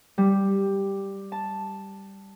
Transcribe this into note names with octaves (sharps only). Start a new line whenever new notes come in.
G3
A5